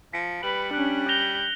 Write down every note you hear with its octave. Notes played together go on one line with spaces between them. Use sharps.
F3 B6 C#7 D7
G3 B4 F#7
C#4 D4 F#6
G6 A#6 F7 G7